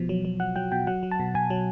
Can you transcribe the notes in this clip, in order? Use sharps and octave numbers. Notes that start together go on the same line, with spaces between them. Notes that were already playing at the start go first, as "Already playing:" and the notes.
Already playing: B2 F3
F#3
F#3
F#3 F#5
F#3 G5
B2 G5
F#3 F#5
F#3
A5
B2
B2 G#5
F#3